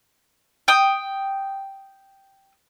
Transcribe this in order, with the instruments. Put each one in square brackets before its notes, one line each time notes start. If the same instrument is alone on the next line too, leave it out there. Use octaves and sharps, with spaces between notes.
[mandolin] G5 D#6